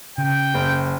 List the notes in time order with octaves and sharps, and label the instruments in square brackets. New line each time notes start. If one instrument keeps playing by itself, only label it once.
[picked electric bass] C#3 [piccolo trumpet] G5
[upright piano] F#1